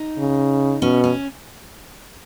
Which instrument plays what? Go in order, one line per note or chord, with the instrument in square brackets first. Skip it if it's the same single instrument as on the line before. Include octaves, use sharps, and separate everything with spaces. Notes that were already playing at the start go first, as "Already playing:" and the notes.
Already playing: [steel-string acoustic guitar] D#4
[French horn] C#3
[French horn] B2 [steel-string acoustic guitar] C#4
[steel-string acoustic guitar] C#4